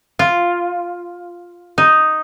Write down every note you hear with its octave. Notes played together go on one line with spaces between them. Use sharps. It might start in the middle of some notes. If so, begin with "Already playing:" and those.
F4
D#4